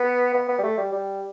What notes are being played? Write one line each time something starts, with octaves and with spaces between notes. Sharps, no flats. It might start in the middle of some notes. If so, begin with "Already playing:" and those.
Already playing: B3
B3
B3
G3
A3
G3
G3